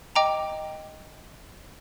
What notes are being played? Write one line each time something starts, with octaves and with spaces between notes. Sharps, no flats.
D#5 G5 A#5 D6